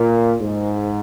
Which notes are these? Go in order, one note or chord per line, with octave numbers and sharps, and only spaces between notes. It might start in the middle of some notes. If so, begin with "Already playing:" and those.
Already playing: A#2
G#2